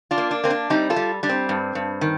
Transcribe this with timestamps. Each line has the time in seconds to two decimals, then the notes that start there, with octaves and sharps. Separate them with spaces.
0.11 D4 F4
0.18 A#3
0.31 D4
0.44 A#3 C4
0.50 D4
0.70 G3 C4 D#4
0.90 F4 A4
0.96 G3
1.23 G3 D4
1.29 C4
1.49 G2
1.75 G2
2.01 D#3